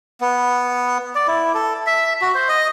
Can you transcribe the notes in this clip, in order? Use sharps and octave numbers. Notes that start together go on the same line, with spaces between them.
B3
D5
E4
A4
E5
F#4
C5
D#5